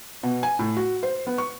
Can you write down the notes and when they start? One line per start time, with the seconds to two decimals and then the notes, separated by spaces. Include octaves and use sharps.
0.23 B2
0.43 G#5
0.59 A2
0.76 F#4
1.03 C5
1.27 B3
1.38 C#6